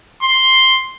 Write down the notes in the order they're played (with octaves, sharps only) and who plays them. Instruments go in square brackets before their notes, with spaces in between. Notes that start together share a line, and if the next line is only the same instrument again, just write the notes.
[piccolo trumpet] C6